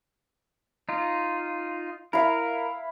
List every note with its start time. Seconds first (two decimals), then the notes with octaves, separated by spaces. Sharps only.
0.89 D#4 F4
2.13 E4 A#4 F5